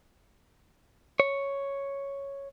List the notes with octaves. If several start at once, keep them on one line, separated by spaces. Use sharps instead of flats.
C#5